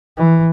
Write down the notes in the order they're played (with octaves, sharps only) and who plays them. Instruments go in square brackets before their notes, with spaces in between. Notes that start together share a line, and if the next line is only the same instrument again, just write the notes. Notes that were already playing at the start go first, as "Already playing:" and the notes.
[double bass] E3